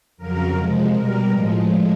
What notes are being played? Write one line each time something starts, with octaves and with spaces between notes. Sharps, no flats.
F2 C#3 F#3 A#4
C3 F3 G#3
B2 G3 A#4
A2 F3 G#3